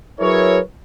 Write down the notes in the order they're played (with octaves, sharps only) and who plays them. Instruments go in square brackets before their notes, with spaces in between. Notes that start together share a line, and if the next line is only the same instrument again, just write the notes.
[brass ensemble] F#3 E4 G#4 A#4 B4 C#5